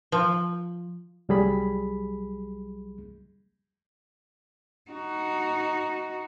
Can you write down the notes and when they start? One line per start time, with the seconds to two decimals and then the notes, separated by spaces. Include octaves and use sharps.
0.12 F3
1.29 C2 F#3 G3 G#4 B5
4.91 D#4 F#4